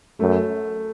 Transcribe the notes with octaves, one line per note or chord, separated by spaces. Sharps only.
F#2 A3